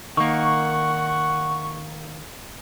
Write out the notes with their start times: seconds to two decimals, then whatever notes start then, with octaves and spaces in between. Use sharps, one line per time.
0.17 D#3 A#3 F#5 C#6